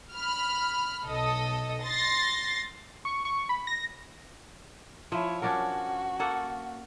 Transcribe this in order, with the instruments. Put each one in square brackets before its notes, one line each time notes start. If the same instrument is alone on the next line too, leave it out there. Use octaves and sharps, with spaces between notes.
[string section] B5 F6
B1 A4 D#5
C6 A6 A#6 C7
[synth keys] C#6
C#6
B5
A#6
[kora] F3 [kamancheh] E4 C#5
[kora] C#4 D4 A#4 [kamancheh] F#4
[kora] A#3 A4 F#5